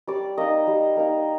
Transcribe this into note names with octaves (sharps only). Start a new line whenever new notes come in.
G3 D5
A#3 D#4 D#5
G3
A#3 D#4